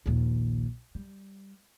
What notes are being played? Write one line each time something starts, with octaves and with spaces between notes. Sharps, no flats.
A#1 D#2
G3